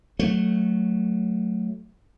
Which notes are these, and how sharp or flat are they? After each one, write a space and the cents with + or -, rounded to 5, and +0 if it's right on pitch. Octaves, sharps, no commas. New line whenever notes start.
F#3 +0 A3 +0